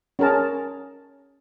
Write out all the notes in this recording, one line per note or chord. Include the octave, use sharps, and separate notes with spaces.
C#4 G#4 A#4 A5